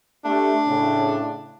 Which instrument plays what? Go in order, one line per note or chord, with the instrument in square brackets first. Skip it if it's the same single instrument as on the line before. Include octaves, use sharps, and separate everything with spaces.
[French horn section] A3 G4 [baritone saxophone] D4
[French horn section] A2 C#3